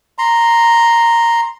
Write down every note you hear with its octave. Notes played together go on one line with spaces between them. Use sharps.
A#5 C6